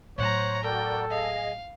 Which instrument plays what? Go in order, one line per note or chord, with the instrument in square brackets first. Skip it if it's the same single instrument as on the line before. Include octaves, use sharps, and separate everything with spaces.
[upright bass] A2 F#3 [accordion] C5 [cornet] C#5 [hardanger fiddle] F#5 A#5
[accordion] F#4 A#4 D5 [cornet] A4 [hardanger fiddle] G5
[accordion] G#4 D#5 [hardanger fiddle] F5